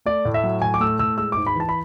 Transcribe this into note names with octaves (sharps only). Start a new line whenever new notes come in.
A3 D5
A2
E5
F#3
A2 G#5
D6
A3 E6
A2 E6
G#3 E6
G#2 D6
B5
E3 A5
B5